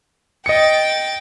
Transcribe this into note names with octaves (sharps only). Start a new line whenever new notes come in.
D#5 G5 A6 C#7